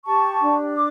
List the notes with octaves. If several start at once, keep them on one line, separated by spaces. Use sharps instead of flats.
G4 A5 C#6
D4
D6